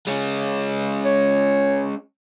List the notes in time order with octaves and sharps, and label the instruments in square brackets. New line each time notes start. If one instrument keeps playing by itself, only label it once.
[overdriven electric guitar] G#3 C#4
[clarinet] C#5